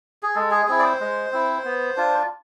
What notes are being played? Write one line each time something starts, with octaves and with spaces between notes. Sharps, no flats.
G#4
G#3 A4
G#4
C4 E4 G#4
D5
C5
G#3
C4 E4
B3
D4 F4